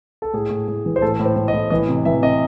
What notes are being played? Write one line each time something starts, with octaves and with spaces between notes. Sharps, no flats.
A4
A2 G#4
A2
A2
E3
C5
A2 A4
A2
C5
A2
D#5
A2
E3 D#5
C3
E3 E5
C3 D#5